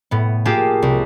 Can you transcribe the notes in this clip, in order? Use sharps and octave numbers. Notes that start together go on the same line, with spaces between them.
A2 B3
A#3 F4 G4 G#4 A5
C2